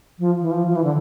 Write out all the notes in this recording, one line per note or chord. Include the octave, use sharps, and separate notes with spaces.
F3
E3
F3
F3
E3
D3